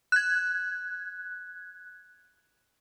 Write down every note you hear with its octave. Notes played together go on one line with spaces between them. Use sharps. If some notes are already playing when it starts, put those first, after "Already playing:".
F#6 G#6